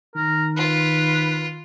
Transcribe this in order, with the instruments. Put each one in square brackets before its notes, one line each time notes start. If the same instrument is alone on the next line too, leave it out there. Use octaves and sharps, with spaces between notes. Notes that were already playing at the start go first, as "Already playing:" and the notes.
[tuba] D#3 [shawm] A#4
[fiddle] F4 [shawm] B4